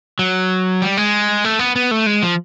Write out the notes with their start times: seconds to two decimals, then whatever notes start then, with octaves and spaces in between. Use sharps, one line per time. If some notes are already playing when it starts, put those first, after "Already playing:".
0.19 F#3
0.82 G3
0.97 G#3
1.44 A3
1.59 B3
1.76 B3
1.91 A3
2.06 G#3
2.23 F3